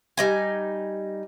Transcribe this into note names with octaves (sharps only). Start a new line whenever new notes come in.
G3 D#4 G#5